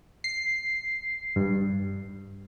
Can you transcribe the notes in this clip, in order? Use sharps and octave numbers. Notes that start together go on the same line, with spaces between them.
C7
G2